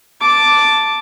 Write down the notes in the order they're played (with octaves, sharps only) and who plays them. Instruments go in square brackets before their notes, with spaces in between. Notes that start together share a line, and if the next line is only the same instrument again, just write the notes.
[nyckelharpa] A5 D6